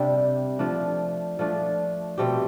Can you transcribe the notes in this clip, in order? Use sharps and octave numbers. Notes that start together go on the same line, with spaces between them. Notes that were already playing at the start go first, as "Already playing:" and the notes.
Already playing: C3 G3 D4 G4
F3 A3 D4
F3 A3 D4
B2 A3 C4 G4